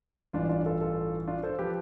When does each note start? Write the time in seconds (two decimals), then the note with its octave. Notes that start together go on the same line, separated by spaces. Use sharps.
0.33 A1 G2 E3 D4 F4
0.49 D4 F4
0.66 F4 A4
0.81 F4 A4
1.27 D4 F4
1.43 A4 C5
1.59 F3 G4 B4